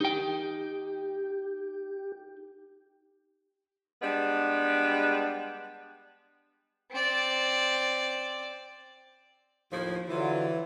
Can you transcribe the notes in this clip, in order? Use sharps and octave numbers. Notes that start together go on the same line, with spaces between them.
D#4 G4 G5
G3 G#3 B3 D4
C4 D5
D#2 A2 F3
D3 E3 F#3 F4